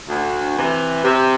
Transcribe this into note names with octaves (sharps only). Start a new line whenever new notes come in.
D2
C3 E3
C3